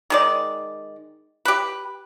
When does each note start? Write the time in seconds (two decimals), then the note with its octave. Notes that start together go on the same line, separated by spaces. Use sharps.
0.10 D#3 G#3 D5
1.45 G4 B4